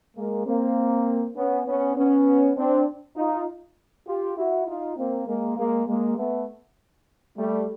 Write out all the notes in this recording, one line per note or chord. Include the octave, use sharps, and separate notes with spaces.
G#3 A#3
A#3 C4
B3 C#4
B3 C#4
B3 C#4
C4 D4
D#4 F4
F4 G4
E4 F#4
D#4 F4
A#3 C4
G#3 A#3
G#3 A#3
G#3 A#3
A3 B3
G3 A3